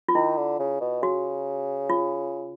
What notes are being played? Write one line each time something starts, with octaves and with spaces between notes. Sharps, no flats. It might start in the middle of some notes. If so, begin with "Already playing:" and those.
F4
D#3 E4
D3
C#3
B2
C#3 F#4
F4